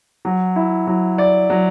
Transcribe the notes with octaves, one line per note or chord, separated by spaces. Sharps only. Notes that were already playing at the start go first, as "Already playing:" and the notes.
F#3
E4
F#3
D5
F#3